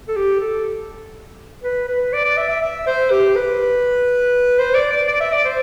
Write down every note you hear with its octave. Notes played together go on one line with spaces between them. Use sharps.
A4
G4
A4
B4
B4
D5
D5
E5
E5
E5
C5
G4
B4
C5
D5
D5
D5
E5
D5
C5